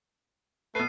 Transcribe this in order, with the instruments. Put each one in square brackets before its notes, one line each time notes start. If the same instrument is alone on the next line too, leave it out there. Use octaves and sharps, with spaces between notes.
[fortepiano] B2 B4 [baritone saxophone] A3 [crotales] C7 D#7